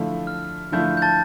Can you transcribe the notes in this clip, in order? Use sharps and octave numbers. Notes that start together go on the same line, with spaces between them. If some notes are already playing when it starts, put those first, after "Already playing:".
Already playing: D3 F3 A3 E4
F6
D3 F3 A3 E4 G6
G6
A5 A6